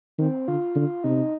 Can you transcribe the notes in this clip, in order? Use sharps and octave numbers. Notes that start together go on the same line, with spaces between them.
D#3 C4
D3 F4
D3
C3 D#4